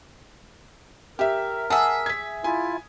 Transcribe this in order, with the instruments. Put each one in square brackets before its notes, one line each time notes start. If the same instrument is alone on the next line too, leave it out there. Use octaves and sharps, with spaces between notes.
[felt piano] G4 E5 [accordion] A#4
[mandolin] G#4 E5 [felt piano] F#5 A5 D#6
[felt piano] G#6 B6
[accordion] E4 F4 [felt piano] G#5